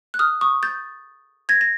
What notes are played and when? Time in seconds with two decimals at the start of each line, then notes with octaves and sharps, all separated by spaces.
0.14 F#6
0.19 D#6 F6
0.41 C#6 D#6
0.63 G6 A6
1.49 G#6 A#6
1.61 A#6